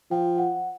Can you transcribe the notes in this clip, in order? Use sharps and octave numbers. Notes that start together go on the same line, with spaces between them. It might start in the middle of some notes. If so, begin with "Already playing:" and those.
F3 G5
F#5